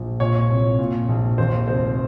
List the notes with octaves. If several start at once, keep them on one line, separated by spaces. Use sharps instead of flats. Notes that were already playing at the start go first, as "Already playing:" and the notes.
Already playing: A#1
A#2 C#5
C2
A#2
A#1
D#2 C5
F1 C5